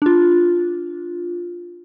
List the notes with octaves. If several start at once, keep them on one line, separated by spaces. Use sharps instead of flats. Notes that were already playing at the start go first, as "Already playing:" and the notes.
D4 F4